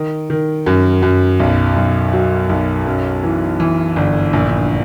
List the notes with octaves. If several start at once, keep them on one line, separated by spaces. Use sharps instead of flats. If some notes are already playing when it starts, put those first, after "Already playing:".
Already playing: D#3
D#3
F#2
F#2
B1
B1
F#3
B1
F#2
E3
E3
G1
A#1